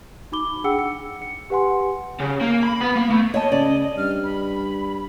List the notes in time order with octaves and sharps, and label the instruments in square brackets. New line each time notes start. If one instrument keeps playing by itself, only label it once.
[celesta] D#4 F#4 B5 D6 G7
D4 G#4 F#5 G5 E6 C#7
C#7
C#7
G4 B4 F#5 G#5 C6
[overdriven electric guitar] C#3
A#3
B5
B3
A#3
A3
[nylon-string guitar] C#5 A5 [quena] D#5
[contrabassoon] C#3 [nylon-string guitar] D5
[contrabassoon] G2 [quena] F6
[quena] B5